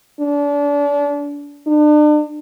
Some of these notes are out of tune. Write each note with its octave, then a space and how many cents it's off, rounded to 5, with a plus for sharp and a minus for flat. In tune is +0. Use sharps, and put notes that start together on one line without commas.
D4 -30
D4 +40